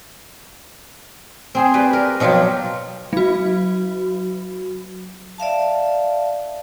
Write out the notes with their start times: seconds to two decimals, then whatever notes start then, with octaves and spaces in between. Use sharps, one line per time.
1.55 C4 G#4 C5
1.74 G4 B4 D5
1.93 A#4
2.20 B2 F3 F#3 F4 G4
3.13 F#3 F#4
5.38 D5 E5 F5 A5